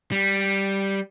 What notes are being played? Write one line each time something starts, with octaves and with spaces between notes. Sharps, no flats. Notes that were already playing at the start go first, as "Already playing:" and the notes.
G3